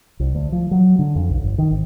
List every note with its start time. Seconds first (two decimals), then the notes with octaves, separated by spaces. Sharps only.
0.20 C2
0.35 D2
0.52 F3
0.71 F#3
0.99 D3
1.16 F2
1.30 B1
1.42 G1
1.58 D#3
1.71 G#1